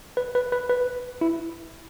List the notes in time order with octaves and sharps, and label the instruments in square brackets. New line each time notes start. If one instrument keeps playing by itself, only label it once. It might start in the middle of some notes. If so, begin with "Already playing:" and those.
[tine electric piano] B4
B4
B4
B4
E4